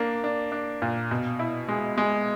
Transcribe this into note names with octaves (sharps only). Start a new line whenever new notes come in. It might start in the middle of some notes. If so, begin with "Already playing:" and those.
Already playing: A#3 D4
D4
D4
A#2
B2
E4
G#3
G#3